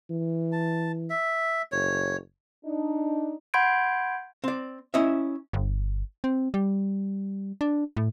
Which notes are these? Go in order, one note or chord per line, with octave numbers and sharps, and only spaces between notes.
E3
A5
E5
F#1 C#5
D4 D#4
F#5 B5 C6 G6 G#6 D7
C4 D5
C#4 E4 D#5 E5
G1
C4
G3
D4
A2